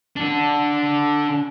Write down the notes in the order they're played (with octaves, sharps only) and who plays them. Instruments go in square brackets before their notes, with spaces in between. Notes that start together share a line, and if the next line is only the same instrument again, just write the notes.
[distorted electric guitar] D4 A4